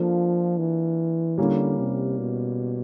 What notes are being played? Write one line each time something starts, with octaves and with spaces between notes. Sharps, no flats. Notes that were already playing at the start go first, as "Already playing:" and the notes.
Already playing: F3 A#3 D4 F4 A4
E3
D3 G3 A#3 C#4 E4
C3
B2